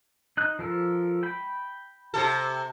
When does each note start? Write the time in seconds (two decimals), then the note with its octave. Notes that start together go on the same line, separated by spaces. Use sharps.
0.37 D#4 F#6
0.59 F3 A4 A#4
1.23 G5 B5
2.14 C3 A4